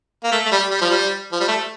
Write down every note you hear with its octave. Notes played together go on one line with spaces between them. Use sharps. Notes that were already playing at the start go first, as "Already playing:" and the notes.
A#3
A3
A3
G3
G3
F3
G3
F3
G3
A3